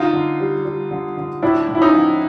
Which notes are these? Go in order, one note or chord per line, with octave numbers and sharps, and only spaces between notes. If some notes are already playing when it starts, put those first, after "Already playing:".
Already playing: D3 D#4 F4
D3
G3
G3
D3
D3
A2 D4 E4
A2
E4
C#4 D#4
F3